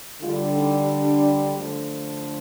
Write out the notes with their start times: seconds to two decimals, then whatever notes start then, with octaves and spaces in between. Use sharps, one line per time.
0.22 D3 G3 F4
0.56 D#4
0.89 D4
1.55 D3 F3 A3